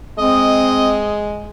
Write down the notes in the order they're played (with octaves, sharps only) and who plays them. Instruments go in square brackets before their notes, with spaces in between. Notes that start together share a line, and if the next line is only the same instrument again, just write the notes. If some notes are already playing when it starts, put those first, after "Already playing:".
[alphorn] G#3 [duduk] C4 [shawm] D#5